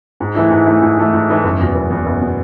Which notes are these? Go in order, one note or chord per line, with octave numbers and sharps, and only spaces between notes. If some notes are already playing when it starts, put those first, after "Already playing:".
G#2
E3 A3 E4
G#2
E3 A3 E4
G#2
E3 A3 E4
G#2
E3 A3 E4
F#1
E2 B2
F#1
E2 B2
F#1
B2